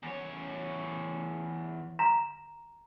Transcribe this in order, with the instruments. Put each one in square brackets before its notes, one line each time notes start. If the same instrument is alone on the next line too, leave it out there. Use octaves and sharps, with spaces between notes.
[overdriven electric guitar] E2 C#5
[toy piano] A#5